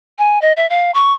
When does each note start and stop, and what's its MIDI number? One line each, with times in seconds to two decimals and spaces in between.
0.19 0.41 80
0.42 0.53 75
0.57 0.68 76
0.70 0.91 77
0.94 1.13 85